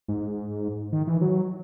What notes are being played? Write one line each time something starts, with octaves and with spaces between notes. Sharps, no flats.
G#2
D#3
E3
F#3